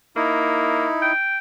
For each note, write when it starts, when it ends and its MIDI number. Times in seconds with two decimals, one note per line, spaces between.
0.16 0.86 58
0.16 1.12 63
0.16 1.12 64
1.02 1.38 79